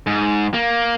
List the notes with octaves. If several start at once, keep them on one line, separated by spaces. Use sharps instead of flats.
G#2
A#3